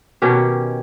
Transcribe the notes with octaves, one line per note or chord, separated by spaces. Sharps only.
B2 D#3 C#4 G4